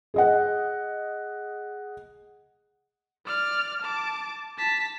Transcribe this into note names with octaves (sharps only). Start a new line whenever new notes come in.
G#4 D#5 F#5
D5 F6
A5 D6
A5 B6